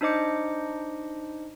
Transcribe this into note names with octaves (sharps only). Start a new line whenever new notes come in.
D4 D#4 C5 D#5 D6 C#7